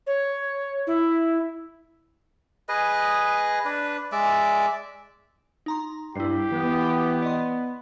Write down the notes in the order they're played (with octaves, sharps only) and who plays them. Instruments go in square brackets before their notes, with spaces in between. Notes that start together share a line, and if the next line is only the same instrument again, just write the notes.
[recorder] C#5
E4
[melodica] G#4 B4 D#5
D4 B4
G#3 D5 E5
[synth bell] D#4 A#5 C6
[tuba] G2 [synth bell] E4 C7 [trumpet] G4
[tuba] E3 [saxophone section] B3
[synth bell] D5 D#5 C6